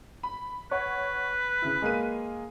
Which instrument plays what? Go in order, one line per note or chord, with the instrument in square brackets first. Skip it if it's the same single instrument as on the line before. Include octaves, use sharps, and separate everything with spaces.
[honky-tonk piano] B5
[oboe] B4 [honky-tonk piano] C#5 F#5
[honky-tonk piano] C#3 E4
G#3 A#3 D#7